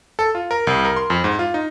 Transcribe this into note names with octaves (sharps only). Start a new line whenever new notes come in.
A4
F4
A#4
C2
A#4
C6
F2
G#2
F4
D#4